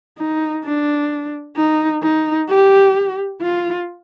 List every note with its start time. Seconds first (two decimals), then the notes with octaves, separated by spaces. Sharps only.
0.18 D#4
0.64 D4
1.57 D#4
2.03 D#4
2.49 G4
3.41 F4